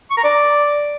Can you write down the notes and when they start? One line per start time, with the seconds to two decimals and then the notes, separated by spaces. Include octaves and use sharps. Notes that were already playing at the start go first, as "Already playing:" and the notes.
0.10 C#6
0.17 A#5
0.24 D5